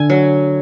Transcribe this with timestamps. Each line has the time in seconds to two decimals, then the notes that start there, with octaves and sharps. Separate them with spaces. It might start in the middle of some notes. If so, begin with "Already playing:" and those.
Already playing: D3 G#5
0.10 F#3